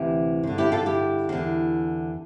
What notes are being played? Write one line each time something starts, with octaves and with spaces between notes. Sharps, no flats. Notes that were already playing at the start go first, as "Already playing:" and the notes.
Already playing: D2 C3 E3 E4 G4
G2 D3
E4 G4
F4 A4
E4 G4
E2 D3